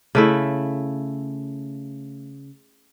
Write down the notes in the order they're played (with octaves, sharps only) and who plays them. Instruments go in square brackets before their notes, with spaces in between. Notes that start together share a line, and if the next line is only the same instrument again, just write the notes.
[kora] C#3 A3 E4